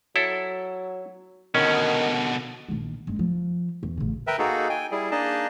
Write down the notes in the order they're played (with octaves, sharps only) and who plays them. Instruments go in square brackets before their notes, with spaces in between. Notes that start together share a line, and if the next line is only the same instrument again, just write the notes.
[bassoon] F#3 [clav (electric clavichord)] E4 A4
[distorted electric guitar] B2 D3 [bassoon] D#3 [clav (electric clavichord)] C#4
[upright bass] A#1 D#3
F#1 G#3
F3
E2
A1 C#3
[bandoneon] A#4 B4 E5 G5
A#3 D#4 F#4 G#4 A4
G5 G#5
G3 E4 G#4
A#3 D4 D#4 G#4 D#5 A5